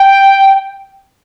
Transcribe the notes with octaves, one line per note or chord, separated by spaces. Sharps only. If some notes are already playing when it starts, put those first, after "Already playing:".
Already playing: G5